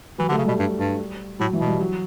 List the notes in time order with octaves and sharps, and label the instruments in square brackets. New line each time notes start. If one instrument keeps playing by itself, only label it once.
[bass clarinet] E3 [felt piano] F#3
[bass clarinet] D3
[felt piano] A3
[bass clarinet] C#3
[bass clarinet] B2 [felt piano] G3
[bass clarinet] G2
G2
[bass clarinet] A2 [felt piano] F#3
[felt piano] E3
[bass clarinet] B2
[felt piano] G3
F#3